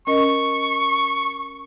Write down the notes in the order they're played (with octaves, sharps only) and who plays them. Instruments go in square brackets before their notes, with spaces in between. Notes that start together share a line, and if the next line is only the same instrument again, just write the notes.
[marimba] C#4 A#4 D#5 [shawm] C#6